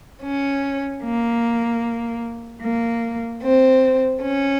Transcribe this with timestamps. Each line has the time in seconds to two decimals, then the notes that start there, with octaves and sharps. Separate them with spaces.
0.23 C#4
1.03 A#3
2.62 A#3
3.43 C4
4.21 C#4